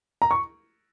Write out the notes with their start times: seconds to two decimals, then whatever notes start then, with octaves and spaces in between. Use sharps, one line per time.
0.22 A#5
0.31 C#6